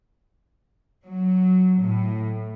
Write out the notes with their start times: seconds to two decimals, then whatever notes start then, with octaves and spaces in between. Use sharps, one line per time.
1.06 F#3
1.80 A2